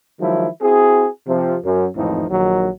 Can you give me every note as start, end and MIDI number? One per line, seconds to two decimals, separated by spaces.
0.20 0.46 51
0.20 0.46 53
0.20 0.46 54
0.20 0.46 56
0.20 0.46 64
0.61 1.06 60
0.61 1.06 64
0.61 1.06 66
0.61 1.06 68
1.26 1.56 48
1.26 1.56 53
1.63 1.86 42
1.96 2.24 32
1.96 2.24 41
1.96 2.24 45
1.96 2.24 52
1.96 2.24 53
1.96 2.24 63
2.29 2.68 34
2.29 2.68 51
2.29 2.68 54